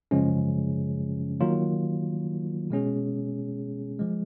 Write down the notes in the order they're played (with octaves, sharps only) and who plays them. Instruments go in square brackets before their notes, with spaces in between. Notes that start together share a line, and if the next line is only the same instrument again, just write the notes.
[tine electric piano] F#2 C#3 F3 G#3 C#4
D#3 F#3 A#3 F4
B2 G#3 C#4 G#4
F3 G#3